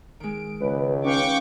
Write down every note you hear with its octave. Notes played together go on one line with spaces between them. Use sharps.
D#3 G#3 D7
C#2 B4
C#4 D#4 B4 F5 G5 C#6 D6